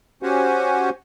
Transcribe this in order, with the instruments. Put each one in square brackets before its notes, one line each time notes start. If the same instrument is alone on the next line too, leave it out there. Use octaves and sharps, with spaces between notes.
[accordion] C#4 F#4 G4 C5 F#5 G#5